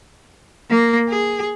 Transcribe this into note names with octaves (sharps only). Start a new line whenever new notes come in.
A#3
G#4